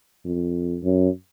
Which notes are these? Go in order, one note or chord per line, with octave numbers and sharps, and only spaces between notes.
F2
F#2